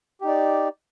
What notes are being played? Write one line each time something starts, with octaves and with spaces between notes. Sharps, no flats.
D#4 G4 D5